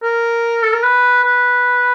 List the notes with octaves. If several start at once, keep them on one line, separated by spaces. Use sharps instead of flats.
A#4
A4
A#4
B4
B4